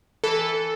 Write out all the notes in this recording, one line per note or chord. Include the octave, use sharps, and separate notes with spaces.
E3 A4
E3